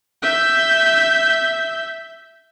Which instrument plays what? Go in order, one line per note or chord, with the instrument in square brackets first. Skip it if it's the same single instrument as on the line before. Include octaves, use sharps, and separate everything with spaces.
[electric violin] E5 G6